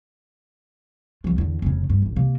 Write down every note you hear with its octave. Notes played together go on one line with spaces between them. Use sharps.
C2 F3
E2 D3
F1 C#3
G2
D1 A1
C3 A#3